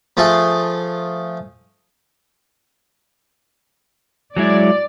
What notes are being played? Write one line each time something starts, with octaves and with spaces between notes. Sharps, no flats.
F3 A3 G#4 C6
F#3 G#3 E4 D5